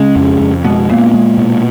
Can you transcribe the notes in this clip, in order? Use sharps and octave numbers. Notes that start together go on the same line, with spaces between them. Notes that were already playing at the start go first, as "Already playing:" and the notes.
Already playing: C#3 G#3
F2
F2
B2 G#3
A#2 B3
G#3
B2